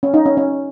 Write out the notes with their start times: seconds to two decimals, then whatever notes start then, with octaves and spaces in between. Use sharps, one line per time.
0.03 C#4
0.14 D#4
0.25 C#4
0.37 C#4